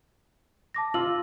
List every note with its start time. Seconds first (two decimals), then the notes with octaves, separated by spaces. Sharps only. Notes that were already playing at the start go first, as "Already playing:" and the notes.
0.74 A5 D6 A#6
0.94 F4 E6 F#7